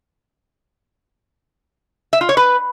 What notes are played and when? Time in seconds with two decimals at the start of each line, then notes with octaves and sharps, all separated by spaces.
2.13 E5
2.21 F4
2.29 C#5
2.37 B4